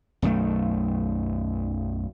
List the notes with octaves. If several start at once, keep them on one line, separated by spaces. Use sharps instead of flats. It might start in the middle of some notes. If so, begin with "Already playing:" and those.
B1 F#2 D#3 A3